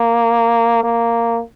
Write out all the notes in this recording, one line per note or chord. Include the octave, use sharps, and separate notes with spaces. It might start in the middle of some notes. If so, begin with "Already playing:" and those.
Already playing: A#3
A#3